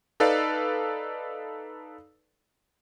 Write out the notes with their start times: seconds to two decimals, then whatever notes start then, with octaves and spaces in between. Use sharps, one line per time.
0.20 D#4 A4 B4 D5 F5